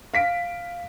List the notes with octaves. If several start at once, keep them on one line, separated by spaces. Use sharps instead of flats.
F5 B6 D7